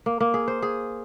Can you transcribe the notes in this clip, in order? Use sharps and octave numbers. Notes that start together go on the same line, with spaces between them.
A#3
A#3
G#4
C5
G#4